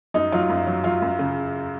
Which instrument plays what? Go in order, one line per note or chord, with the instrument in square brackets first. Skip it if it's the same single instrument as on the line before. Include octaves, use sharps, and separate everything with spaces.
[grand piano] F#2 [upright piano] D#4
[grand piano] F#3 [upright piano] F4
[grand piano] F#2
F#3
[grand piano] F#3 [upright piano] F4
[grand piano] F#2
C#3